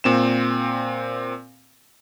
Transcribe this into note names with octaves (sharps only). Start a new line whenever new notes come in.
A#2 C4 E7